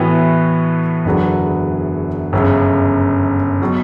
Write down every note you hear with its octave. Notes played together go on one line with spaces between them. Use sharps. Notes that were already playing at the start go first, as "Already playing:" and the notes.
Already playing: A2 E3 B3 F#4
F#1 E2 D3 F#3 B3
G1 F#2 C#3
B2 F#3